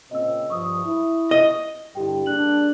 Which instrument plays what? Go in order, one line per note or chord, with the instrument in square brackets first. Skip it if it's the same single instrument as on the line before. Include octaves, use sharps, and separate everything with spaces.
[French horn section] A#2 C#3 C4 [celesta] D#5 E6
[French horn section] G2 F3 [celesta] C#6 D#6
[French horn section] E4
[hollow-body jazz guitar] D#5
[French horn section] G2 D3 G3 [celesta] E4 G4 G5
[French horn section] G3 A#3 D4 [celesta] G#4 F#6 F#7